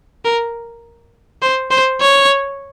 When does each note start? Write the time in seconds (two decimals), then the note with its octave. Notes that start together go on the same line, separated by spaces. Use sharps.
0.25 A#4
1.42 C5
1.71 C5
2.01 C#5